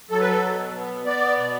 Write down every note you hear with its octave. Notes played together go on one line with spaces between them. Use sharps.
F#3 A4
B4
A4
B2
B3
B3 D5
B2